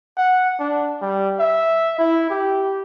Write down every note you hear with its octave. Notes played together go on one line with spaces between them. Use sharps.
F#5
D4
G3
E5
E4
G4